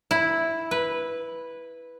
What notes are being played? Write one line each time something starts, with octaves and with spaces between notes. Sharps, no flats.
E4
B4